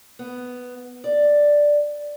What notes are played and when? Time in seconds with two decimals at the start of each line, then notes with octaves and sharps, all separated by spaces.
0.19 B3
1.04 D5